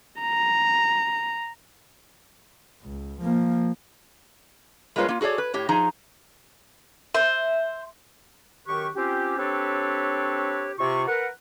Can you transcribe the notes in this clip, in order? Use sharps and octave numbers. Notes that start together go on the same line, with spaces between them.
A#5
C#2
F3 A#3
G3 G#3 A#3 F4 B4 C#5
A#3 F4
F#4 G#4 A4 C#5 D5
B4
A2 G4 C#5
F3 D#4 G#4 A#5
C5 E5
F#2 D#3 G4 B4 C#6
C4 C#4 F4 G4
C4 D4 G4 A4 B4 C#5
C3 F4 C#6
A#4 B4 F#5